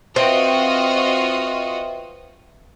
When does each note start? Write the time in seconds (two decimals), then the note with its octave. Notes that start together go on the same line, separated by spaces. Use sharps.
0.16 C4 F4 F#4 B4 D#5 E5 G5